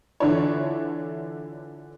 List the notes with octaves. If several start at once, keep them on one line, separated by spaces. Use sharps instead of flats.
D3 E3 D4 E4 F4 C#5